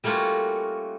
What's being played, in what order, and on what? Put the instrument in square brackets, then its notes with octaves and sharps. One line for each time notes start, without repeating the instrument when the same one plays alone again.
[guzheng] G3 A3 A#3 C#4 F4 F#4